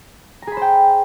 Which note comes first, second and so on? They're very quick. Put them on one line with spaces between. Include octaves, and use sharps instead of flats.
A#5 G#4 B5 C5 G5